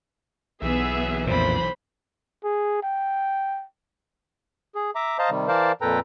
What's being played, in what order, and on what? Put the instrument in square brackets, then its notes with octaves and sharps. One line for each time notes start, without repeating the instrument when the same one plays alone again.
[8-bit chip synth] B1 E3 [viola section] B3 E5 [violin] G#4
[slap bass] F2 A#2 [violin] C5 B5
[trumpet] G#4
G5
[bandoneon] G#4
E5 A#5 D6
C5 D#5 F5 A5 A#5
C3 D#3 G3
E3 A#4 C5 D5 F5 A5
F2 A#2 A4 B4 G5 A#5